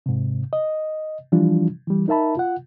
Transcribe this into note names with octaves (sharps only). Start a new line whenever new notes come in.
G#2 C3
D#5
E3 F3 G3 D4 F4
E3 G3
D#4 A#4 E5 A5 B5
F4 F#5